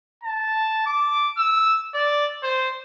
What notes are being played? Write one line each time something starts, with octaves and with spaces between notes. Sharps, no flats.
A5
D6
E6
D5
C5